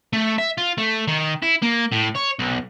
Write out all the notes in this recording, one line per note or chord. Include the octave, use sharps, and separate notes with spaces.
A3
E5
F4
A3
D#3
E4
A#3
A2
C#5
B1